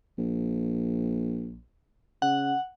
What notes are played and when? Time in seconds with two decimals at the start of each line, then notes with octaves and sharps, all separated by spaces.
0.18 A#1
2.22 C#3 F#5